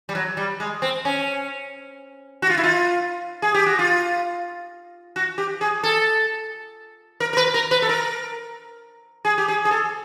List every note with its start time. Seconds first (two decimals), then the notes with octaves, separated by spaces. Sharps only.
0.09 G3
0.15 F#3
0.37 G3
0.60 G#3
0.82 C4
1.05 C#4
2.42 F#4
2.50 F4
2.57 E4
2.64 F4
3.42 G#4
3.54 G4
3.66 F#4
3.79 F4
5.16 F#4
5.38 G4
5.61 G#4
5.83 A4
7.20 A#4
7.33 A#4
7.37 B4
7.54 A#4
7.71 B4
7.82 A4
7.89 A#4
9.25 G#4
9.38 G4
9.48 G#4
9.65 G#4
9.71 A4